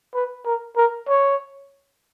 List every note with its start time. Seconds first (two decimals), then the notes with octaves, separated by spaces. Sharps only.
0.15 B4
0.46 A#4
0.77 A#4
1.08 C#5